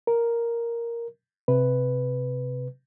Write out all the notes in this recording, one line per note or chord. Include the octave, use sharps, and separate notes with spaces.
A#4
C3 B4